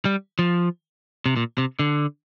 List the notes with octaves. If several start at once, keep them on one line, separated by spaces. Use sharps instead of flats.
G3
F3
C3
A#2
C3
D3